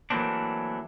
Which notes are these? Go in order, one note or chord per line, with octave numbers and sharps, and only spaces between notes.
E3 F#3 A3 A#3 C4 D4